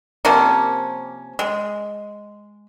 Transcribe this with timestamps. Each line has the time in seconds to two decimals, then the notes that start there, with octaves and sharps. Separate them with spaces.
0.25 C3 F3 A#3 C#4
1.39 G#3